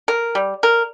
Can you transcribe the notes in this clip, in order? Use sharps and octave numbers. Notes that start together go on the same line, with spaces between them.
A#4
G3
A#4